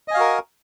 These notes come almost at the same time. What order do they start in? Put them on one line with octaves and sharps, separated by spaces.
D#5 G#5 F5 F#4 A#4